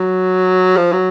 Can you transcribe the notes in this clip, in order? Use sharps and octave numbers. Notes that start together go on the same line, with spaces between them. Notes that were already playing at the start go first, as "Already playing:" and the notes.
Already playing: F#3
F3
F#3